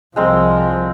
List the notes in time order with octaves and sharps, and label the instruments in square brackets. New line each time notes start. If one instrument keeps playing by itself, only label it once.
[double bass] C2 F3 [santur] G#3 C4 A#4